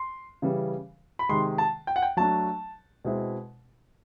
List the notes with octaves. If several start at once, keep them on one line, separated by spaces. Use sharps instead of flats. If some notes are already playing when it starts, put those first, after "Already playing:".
Already playing: C6
C#3 E3 G3
B5
C3 D#3 G#3 C6
A5
G5
F#5
G5
F#3 A3 D4 A5
B2 G#3 C4 E4